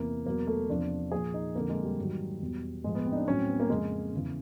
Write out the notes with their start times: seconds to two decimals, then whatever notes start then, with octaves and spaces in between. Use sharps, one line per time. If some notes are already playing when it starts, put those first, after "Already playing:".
Already playing: E2 C3 E3 A#3
0.26 E2 B2 F#3 A#3
0.47 A3
0.70 E2 C3 F3 D4
1.12 A#2 F3 G#4
1.34 D#4
1.55 F2 D3 F3 A#3
1.69 G#3
1.84 G3
1.98 G#2 D#3 F#3
2.41 E2 B2 F#3
2.84 A2 F3 G#3
2.95 B3
3.06 C4
3.12 D#4
3.16 D4
3.27 A2 F#3 C#4
3.38 C4
3.49 B3
3.60 A#3
3.70 F2 C#3 F3 G#3
4.13 E2 C#3 E3